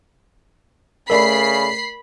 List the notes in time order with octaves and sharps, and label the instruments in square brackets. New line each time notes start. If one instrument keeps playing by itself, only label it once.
[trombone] C#3 [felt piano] A3 D5 [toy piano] A#4 [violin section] B5 C7